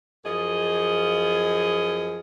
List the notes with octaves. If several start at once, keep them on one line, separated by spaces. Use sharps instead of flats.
F#2 F3 G#4 D#5